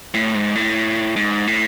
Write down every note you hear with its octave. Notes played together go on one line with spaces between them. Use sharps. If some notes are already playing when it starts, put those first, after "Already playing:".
A2
G#2
A2
G#2
A2